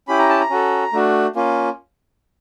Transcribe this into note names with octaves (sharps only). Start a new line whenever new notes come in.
C#4 E4 G4 B5
A#5
A5
A#5
C#4 F#4 A4
A3 D4 F#4
A#3 C#4 F4